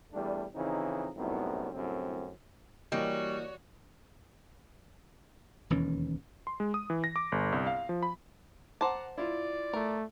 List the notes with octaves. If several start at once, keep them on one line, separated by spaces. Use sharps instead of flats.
E2 G3 A3 D4
F2 C#3 E3 C4 D#4
C2 F#2 A2 B3 C4 D#4
C2 F#2 A2 D3 C4
E3 G3 A#3 F#4 C#5 D#5
E1 D#2 E3 C#4
C6
G#3
D#6
E3
A#6
D6
G1
C2
F5
F3
B5
C5 F#5 A5 A#5 D6
E4 F4 D5
A3 A#4